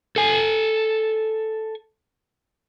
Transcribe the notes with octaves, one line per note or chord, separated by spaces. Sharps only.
A4 G#5